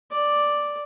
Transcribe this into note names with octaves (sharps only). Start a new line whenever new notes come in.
D5